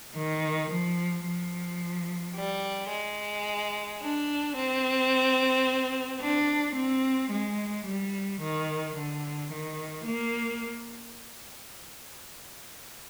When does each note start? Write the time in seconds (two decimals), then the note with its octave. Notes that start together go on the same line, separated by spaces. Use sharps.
0.16 D#3
0.71 F3
1.26 F3
2.36 G3
2.91 G#3
4.01 D4
4.55 C4
6.21 D4
6.76 C4
7.30 G#3
7.86 G3
8.41 D#3
8.96 D3
9.50 D#3
10.05 A#3